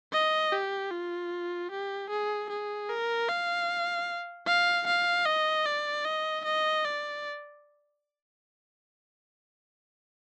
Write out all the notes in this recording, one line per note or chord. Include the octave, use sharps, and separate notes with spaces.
D#5
G4
F4
G4
G#4
G#4
A#4
F5
F5
F5
D#5
D5
D#5
D#5
D5